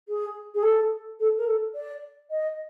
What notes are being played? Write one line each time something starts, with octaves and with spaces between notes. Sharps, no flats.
G#4
G#4
A4
A4
A#4
A4
D5
D#5